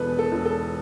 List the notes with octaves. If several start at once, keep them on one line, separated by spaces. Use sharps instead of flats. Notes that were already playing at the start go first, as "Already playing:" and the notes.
Already playing: E1 E2 B2 A4 B4
A4
E1
A4